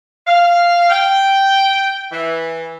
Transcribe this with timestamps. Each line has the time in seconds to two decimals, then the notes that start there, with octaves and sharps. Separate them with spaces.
0.27 F5
0.90 G5
2.13 E3